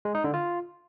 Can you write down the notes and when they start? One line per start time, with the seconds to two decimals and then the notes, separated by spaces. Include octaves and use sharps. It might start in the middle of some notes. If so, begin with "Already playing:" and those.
0.05 G#3
0.15 D#4
0.24 D3
0.34 F4